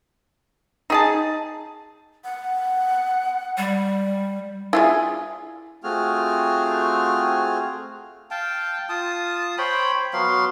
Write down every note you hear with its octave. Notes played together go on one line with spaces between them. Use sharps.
D#4 G#4 A5
F#5
G3
E4 F4 G#4
A3 C4 F4 F#4 G#4 F6
F5 G5 A5
F4 A5 D#6
C5 C#5 G5 B5
F#3 B3 F5 C6